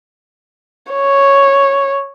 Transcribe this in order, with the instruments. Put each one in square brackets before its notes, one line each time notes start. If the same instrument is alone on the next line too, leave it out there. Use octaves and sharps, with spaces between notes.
[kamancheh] C#5